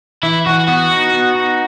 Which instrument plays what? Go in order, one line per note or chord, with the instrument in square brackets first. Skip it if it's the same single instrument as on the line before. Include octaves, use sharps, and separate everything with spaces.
[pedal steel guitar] E3 [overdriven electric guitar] E4
[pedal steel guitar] E3 [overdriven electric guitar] F#4
[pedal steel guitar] B3 [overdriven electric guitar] F#4
[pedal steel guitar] D#4
B3
D#4